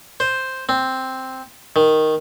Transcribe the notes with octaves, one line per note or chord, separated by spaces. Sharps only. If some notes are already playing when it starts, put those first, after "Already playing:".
C5
C4
D#3